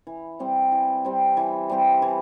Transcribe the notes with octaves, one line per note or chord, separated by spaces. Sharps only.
E3
G3 C4 G4
E3
G3 C4 G4
E3
G3 C4 G4
E3